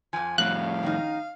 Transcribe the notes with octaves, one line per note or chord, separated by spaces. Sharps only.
F2 F3 G#5
F2 A2 F#4 F5 F#6
D#3 C#4 D#4